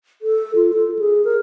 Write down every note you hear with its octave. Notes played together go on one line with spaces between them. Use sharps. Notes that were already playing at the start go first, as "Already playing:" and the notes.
A4
F4
A4
G#4
A#4